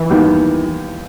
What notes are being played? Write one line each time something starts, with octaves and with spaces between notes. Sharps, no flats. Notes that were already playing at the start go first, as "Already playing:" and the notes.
Already playing: E3
D#2 D#3 G3 B3